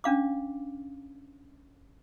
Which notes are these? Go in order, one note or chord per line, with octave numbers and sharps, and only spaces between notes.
C#4 D4 F5 D6